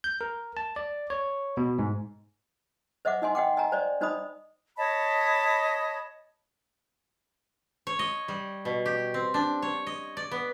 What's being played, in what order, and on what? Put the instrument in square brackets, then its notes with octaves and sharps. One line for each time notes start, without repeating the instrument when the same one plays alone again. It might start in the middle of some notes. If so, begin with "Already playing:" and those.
[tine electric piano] G6
A#4
A5
D5
C#5
B2
G#2
[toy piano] C5 D#5 E5 F#5 D6
D#4 D#5 G#5 C6
D#5 F#5 G5 D6
D#5 G#5 A#5
C5 D5 D#5
D4 D#4 C5 D#5 B5 D#6
[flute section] C#5 D#5 A5 B5
[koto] C#5
D#5
G3
B2
G4
C4
D4
C#5
D#5
D5
B3